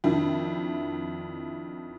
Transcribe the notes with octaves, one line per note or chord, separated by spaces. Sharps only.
F2 D#3 D4 E4